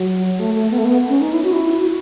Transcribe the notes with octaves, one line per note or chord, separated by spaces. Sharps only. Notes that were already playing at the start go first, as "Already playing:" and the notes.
Already playing: F#3
A3
A3
B3
A3
B3
C#4
D#4
E4
F#4
E4
F#4